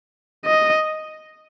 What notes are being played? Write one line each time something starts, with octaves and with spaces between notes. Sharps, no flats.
D#5